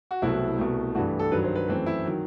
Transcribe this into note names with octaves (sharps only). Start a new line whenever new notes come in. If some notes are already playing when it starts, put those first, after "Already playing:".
F#4
C2 B2 F#3 A3 C4 E4
C2 B2 A3
G2 E3 A3 F#4
G4
A4
G2 D#3 F#3 B4
C5
B4
F#2 E3 A3 C4 B4
E4
D#3 F#3